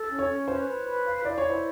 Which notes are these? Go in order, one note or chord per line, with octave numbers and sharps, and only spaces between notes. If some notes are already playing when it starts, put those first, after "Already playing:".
Already playing: A4
C#4
C#5
C#4
B4 C5
B4
B4
F5
E4 D5
C#5
E4
C5